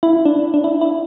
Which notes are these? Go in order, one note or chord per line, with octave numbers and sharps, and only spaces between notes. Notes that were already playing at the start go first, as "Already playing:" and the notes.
E4
D4
D4
E4
E4